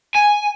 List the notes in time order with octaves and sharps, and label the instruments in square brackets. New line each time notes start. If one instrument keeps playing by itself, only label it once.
[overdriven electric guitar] G#5